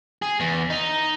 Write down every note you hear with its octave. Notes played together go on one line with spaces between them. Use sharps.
G#4
E2
D#4